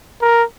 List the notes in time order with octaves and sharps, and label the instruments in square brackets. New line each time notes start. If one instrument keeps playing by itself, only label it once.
[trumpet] A#4